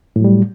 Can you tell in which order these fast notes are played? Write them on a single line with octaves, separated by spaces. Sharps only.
A2 F#3 G3